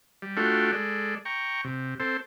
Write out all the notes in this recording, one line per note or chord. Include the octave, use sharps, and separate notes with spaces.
G3
A3 D4 F4 F#4 A4 G5
G#3 A4 D5
G5 A#5 C#6
C3
C4 A4 C5